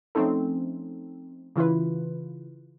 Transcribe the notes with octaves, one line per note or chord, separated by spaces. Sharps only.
F3 A3 C4 C#4 D#4 A4
C#3 E3 E4 F4 B4